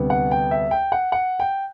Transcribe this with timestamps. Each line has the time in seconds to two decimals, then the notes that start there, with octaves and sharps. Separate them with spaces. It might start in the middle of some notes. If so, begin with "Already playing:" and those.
Already playing: D2 C3 G3 B3
0.10 F#5
0.31 G5
0.51 E5
0.71 G5
0.92 F#5
1.12 F#5
1.40 G5